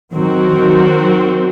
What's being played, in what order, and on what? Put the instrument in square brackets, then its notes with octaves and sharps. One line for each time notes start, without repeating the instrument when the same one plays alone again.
[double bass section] D#3 F#3 [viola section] C4 F#4 A#4
[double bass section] D#3 F#3